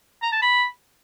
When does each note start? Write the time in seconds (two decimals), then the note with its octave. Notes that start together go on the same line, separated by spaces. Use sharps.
0.22 A#5
0.32 A5
0.42 B5